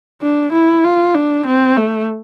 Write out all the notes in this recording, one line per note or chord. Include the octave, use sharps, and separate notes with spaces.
D4
E4
F4
D4
C4
A3